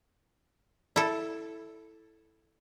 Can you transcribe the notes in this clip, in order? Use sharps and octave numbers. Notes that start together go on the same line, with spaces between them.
E4 A4